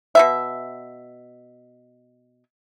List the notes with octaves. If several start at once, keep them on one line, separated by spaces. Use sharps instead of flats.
B2 B3 E5